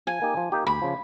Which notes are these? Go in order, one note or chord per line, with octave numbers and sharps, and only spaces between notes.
F3 G#5
A#3 D#4 G4
F3
A#3 D#4 G4
D2 B5
C#3 F3